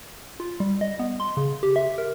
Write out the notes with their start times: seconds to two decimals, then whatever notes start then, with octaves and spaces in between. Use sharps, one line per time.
0.40 F4
0.60 G3
0.81 D#5
0.99 B3
1.20 C6
1.37 C#3
1.63 G4
1.76 E5
1.98 A#4